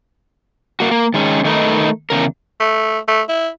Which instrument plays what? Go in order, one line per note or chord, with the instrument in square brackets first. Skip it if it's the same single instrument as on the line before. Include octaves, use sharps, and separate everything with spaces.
[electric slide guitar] A#3 F#4
A#3
D#3 G#3 C#4
D#3 A3 D#4 A#4 B4
E2 C#3 A#4
[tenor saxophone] A3
A3
E4